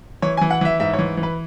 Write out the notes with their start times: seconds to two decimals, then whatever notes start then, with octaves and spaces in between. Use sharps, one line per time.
0.22 E3 C#5
0.37 E3 G#5
0.51 F#5
0.61 E3 E5
0.80 G#2 E5
0.94 C#5
0.99 E3
1.17 E3
1.23 B4